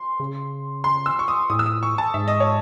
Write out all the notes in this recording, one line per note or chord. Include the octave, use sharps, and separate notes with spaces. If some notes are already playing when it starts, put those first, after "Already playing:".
Already playing: C6
C#3
C6
E6
C#6
D#6
A2 D#6
E6
D#6
C#6
A5
G#2 E5
D#5
C#5